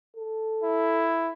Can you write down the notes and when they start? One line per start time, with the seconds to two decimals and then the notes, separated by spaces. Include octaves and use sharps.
0.16 A4
0.64 E4